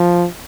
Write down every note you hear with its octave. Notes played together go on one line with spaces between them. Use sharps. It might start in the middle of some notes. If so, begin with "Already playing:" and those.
Already playing: F3